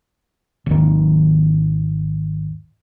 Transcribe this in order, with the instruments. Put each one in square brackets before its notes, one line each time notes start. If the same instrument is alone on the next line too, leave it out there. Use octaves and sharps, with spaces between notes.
[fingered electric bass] G#1 D#2 D#3